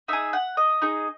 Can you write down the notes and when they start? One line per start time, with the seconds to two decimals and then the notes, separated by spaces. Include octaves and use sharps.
0.08 D#4 G#4 E5
0.33 F#5
0.57 D#5
0.82 D#4 G#4